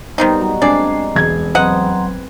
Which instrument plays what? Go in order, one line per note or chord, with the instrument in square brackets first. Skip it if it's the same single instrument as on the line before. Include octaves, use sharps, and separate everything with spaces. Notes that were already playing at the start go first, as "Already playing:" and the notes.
[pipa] D#3 C4 D#4 [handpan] G3 B3
[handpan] F#3 G3 F#4 [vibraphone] D#5 A#5
[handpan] G#3 A#3 C4 [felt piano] D4 G#5 C7 [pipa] D5
[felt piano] E1 G#6
[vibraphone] F#3 A#5 C6 [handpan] C4 B4 [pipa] D#5 F#5